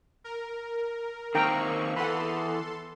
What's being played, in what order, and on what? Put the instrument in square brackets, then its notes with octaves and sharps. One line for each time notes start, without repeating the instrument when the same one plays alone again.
[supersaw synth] A#4
[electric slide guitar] D#3 A#3 C4 [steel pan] A#4 G5 A#5 [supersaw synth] C#6
[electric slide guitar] E3 B3 [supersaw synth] A4 C6 [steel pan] F#5 B5